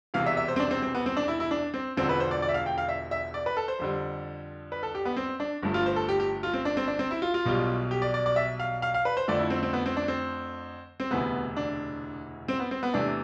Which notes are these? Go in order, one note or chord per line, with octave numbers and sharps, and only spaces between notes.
E1 E2 C3 E3 F5
E5
E5
C5
C4
D4
C4
C4
B3
C4
D4
E4
E4
D4
C4
E1 E2 D3 F3 C4
B4
C5
D5
D5
E5
F5
G5
F5
E5
E5
D5
B4
A4
C5
F2 D3 G3
B4
A4
G4
B3
C4
D4
G1 G2 F3 A3
F4
C5
A4
G4
G4
F4
C4
D4
C4
D4
C4
E4
F4
F4
B1 B2 G3
G4
D5
D5
D5
E5
F5
F5
F5
B4
C5
F2 D3 F3 A3 D5
E4
C4
C4
B3
C4
D4
C4
C4
E1 D2 C3 E3 B3
D4
C4
B3
C4
B3
E2 C3 E3 A3 D4